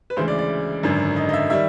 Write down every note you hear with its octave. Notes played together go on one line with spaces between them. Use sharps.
B4
D2 C#3 E3 G#3 C5
D5
D5
G#1 F#2 D3
D#5
D#5
E5
D#3 G3 E5